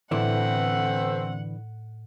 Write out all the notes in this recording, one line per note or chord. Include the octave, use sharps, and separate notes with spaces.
A2 D3 E3 A3 B3 C4 E4 F#5